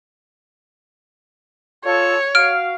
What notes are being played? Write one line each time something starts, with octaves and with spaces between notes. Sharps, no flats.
F4 A4 C#5
F#4 F5 F6 D7